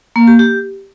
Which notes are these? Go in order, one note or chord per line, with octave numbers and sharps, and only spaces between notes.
A#3
G4
G4